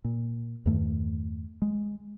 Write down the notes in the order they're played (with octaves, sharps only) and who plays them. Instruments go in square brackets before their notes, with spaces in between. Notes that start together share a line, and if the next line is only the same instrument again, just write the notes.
[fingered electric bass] A#2
E2 G2 D#3 A3
G#3